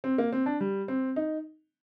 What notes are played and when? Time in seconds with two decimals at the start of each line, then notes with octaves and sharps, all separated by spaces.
0.04 C4
0.18 A#3
0.32 C4
0.46 D4
0.60 G3
0.88 C4
1.16 D#4